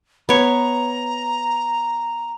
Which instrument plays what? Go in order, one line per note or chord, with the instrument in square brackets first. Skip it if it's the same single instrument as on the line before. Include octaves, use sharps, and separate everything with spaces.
[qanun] B3 C#5 [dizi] A#5